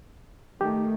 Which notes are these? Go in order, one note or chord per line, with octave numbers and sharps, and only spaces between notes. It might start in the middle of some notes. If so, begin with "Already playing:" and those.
D#3 A3 G4